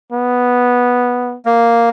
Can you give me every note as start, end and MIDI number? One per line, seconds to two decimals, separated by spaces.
0.12 1.37 59
1.46 1.89 58